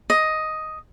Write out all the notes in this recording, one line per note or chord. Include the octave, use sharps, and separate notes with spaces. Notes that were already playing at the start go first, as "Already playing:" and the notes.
D#5